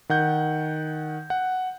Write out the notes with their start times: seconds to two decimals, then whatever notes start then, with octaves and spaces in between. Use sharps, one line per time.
0.09 D#3 F#5 G6
1.30 F#5